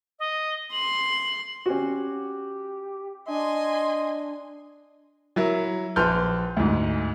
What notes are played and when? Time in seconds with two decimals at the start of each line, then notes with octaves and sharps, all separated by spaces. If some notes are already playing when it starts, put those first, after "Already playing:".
0.19 D#5
0.72 C6 F#7
1.66 C#4 F#4 G4
3.28 D4 D#5 G#5 C6
5.36 F#3 E4 A#4
5.96 A#1 B4 A5 C6 F6 G6
6.57 D2 G#2